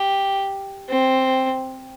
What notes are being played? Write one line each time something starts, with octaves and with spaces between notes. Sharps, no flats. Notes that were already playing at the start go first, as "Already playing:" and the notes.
Already playing: G4
C4